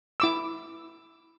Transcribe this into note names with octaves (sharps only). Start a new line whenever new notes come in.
E4 D6 E6